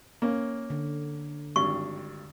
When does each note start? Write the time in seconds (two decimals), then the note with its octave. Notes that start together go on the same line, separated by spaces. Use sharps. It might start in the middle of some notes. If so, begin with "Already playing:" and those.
0.22 A#3 C#4
0.70 D3
1.56 G#1 G2 C#6